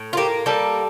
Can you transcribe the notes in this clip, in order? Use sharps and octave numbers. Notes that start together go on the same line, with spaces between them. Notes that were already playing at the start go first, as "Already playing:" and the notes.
Already playing: A2
F4
A#3 G4
G3 A4